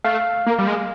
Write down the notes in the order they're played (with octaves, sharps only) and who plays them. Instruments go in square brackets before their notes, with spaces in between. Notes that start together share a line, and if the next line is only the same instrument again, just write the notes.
[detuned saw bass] A3 [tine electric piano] F5
[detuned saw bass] A#3
G3
G#3